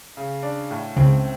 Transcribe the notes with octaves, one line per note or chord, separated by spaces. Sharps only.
C#3
D4
A2
C#2 C#3 C4